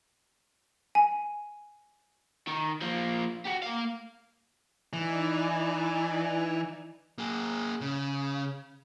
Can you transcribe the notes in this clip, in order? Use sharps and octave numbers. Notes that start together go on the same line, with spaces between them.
G#5
D#3
F3 A#3
F#4 G4
A#3 F5
E3 D#4 D5 G#5
A#3 G#4
C#3